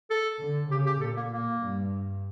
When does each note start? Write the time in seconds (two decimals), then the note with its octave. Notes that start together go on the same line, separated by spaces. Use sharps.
0.10 A4
0.41 D3
0.71 C#3 G4
0.87 G4
1.01 A#2 A4
1.17 A#3
1.32 A#3
1.62 G2